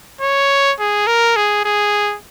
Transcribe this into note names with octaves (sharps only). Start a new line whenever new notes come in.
C#5
G#4
A#4
G#4
G#4